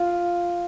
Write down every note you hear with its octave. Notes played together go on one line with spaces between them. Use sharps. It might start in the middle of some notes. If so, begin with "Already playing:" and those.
Already playing: F4